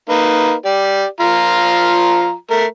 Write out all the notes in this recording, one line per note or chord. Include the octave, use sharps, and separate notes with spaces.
A#3 D#4 B4
G4 D5
F3 F4 A#5
A3 A#4